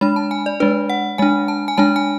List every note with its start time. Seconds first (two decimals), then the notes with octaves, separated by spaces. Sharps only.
0.01 G#3 D4 B5
0.16 A5
0.31 G#5
0.46 D5
0.60 G#3 D4 B4
0.90 F#5
1.18 G#3 D4 G#5
1.48 A5
1.68 G#5
1.78 G#3 D4 A5
1.96 G#5